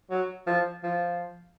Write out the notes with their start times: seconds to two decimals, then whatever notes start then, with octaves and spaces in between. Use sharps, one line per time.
0.10 F#3
0.47 F3
0.83 F3